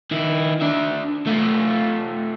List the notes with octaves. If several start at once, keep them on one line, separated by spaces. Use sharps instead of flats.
D#3 E4
D4 E5
A3 F4